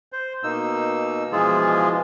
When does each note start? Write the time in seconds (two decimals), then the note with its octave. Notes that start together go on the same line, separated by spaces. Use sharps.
0.12 C5
0.44 B2 A#3 D#4 E6
1.32 B2 E3 F3 G#3 F4 G#4